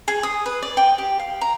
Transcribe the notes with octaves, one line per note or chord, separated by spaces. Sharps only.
G#4
D#6
B4
D5
G5
G4
F5
A#5